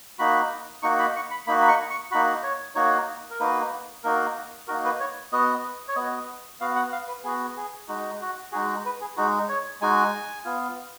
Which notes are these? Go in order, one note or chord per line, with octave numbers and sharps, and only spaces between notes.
A#3 D#4 F#4 B5
A#3 D#4 F#4 C#6
B5
C#6
B5
A#3 D#4 F#4 B5
B5
C#6
C#6
A#3 D#4 F#4 B5
C#5
A#3 D#4 F#4 C#5
A#4
A#3 D#4 F#4 B4
A#3 D#4 F#4 A#4
A#3 D#4 F#4 A#4
B4
C#5
B3 F#4 D#5
C#5
B3 F#4 D#5
B3 F#4 F5
F#5
F5
B4
B3 F#4 G#4
G#4
G#3 D#4 F#4
F#4
G#3 D#4 F#4 G#4
B4
G#4
G#3 D#4 F#4
C#5
G#3 D#4 F#4 G#5
B3 F4